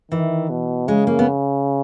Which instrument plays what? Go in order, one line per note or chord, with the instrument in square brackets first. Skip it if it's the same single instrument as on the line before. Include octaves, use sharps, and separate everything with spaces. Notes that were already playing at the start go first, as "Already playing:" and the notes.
[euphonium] D#3 [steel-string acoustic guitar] E3
[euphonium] B2
[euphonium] C#3 [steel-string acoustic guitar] G#3
[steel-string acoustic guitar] A#3
B3